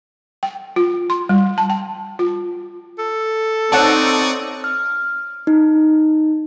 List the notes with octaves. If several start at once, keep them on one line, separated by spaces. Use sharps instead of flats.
G5
F4
C6
G3
A5
G5
F4
A4
C4 D#4 C#5 D5 F#5 A5 C#6 D#6
F6
D#4